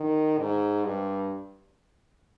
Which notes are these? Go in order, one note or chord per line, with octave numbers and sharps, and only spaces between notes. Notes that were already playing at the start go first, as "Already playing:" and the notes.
Already playing: D#3
G#2
G2